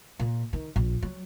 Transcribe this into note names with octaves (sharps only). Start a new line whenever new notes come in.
A#2
D#3
A#1
F#3